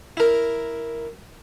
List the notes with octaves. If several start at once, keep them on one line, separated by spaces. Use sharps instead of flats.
E4 A#4